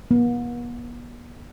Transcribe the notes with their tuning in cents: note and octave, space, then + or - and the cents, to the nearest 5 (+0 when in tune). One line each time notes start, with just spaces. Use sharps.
B3 -45